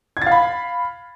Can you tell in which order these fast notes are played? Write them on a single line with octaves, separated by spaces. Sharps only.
G#6 A6 F5 B5